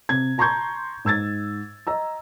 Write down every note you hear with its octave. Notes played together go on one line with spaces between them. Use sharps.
C3 G#6
A5 A#5 C6 C#6 G6 G#6
G#2 E6 G#6 A6
D#5 A#5 E6